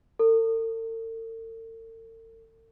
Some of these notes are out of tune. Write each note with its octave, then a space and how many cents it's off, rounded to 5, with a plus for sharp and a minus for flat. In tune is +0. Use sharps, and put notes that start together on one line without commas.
A4 +45